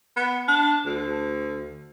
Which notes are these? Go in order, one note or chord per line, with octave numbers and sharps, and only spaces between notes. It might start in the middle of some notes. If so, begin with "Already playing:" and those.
B3
D4
D2